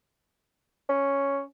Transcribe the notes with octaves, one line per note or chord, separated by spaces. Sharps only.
C#4